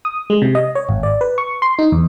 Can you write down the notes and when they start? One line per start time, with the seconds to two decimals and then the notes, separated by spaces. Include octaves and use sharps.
0.05 D#6
0.30 G#3
0.42 C3
0.55 D#5
0.75 C#5
0.89 G#1
1.03 D5
1.21 B4
1.38 C#6
1.62 C6
1.79 D#4
1.92 E2